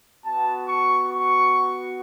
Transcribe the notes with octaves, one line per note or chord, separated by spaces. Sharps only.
B3 F#4 A5
C#6
C#6